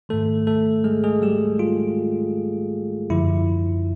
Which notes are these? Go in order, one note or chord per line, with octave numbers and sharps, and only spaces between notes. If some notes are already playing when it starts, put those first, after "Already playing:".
G#2 D#3 A3 A4
A3 A4
G#3 G#4
G#3 G#4
G3 G4
F4
F#2 D3 F3 E4